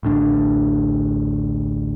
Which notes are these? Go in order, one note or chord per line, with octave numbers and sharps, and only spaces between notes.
A1 D2 D4